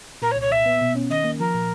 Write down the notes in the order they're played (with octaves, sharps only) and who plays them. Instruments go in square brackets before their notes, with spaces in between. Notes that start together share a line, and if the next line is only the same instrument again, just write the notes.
[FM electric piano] A#2 [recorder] A#4
[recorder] C#5
[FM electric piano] C2
[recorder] C#5
[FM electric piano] A#2 [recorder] E5
[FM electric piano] B3
B2
C#4
[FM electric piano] D#3 [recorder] D#5
[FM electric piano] A#3
[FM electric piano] F3 [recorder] A#4
[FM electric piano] A#2